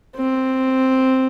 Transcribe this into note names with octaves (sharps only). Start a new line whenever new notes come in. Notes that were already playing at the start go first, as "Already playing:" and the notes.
C4